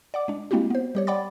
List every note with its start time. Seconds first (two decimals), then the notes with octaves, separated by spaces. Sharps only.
0.14 D5 F#5 D6
0.28 G#3 D4
0.51 G#3 A#3 C4 E4 F#4 G4
0.70 B3 C5
0.95 G3 G4 C#5
1.07 D5 F#5 G5 B5 D6 A6